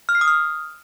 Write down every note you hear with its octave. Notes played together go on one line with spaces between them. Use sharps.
F6
C7
D#6
F6